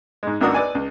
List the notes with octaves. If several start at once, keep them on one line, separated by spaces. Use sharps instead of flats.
G#2 G#3
G#1 C#2 A#3 D4 F#4 D#6
B4 D5 G#5
C#2